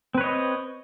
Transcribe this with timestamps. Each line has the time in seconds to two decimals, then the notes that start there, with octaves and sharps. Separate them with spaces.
0.15 C4
0.18 B4
0.21 C#5
0.24 D#5